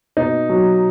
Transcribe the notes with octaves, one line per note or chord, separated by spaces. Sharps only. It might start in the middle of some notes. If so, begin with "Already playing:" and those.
B2 D#4
F#3